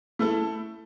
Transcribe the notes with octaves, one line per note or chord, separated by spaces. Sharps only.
A3 E4 A4